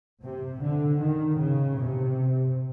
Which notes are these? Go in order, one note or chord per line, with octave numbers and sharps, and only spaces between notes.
C3
D3
D#3
C#3
C3